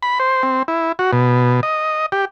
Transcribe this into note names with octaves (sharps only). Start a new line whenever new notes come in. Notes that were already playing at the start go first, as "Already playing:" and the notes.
B5
C5
C4
E4
F#4
B2
D#5
G4